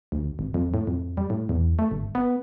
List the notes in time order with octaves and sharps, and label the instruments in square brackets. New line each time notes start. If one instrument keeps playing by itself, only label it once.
[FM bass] D2
G#1
F2
A2
F2
G3
A2
E2
A3
G1
B3